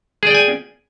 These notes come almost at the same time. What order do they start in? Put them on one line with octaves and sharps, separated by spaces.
G#4 D5 G5 G#5